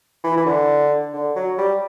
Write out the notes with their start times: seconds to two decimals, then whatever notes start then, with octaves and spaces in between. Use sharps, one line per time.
0.24 E3
0.37 E3
0.46 D3
1.13 D3
1.35 F#3
1.58 G3